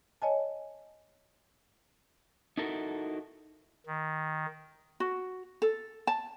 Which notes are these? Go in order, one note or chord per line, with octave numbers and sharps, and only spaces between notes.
C#5 D#5 G#5 A5
D#4 E4 F#4 A4 A#4
D#3
F#4
A4
A5